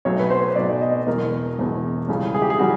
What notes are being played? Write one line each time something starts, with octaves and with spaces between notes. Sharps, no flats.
B1 B2 F#3 A3 C#5
B4
C5
B1 B2 F#3 A3 D5
D#5
E1 E2 B2 A#4
E1 E2 B2
C#2 C#3 E3 G3
G#4
G4
G#4
C#3 E3 G3 F#4